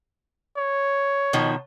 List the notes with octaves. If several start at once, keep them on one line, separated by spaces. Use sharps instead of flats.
C#5
B2 D#3 F3